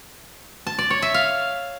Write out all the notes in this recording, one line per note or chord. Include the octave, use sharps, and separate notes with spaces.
A5
D5
C#5
E5
F5